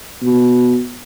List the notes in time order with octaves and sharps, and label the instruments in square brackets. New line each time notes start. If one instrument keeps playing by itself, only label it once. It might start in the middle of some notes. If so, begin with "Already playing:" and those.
[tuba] B2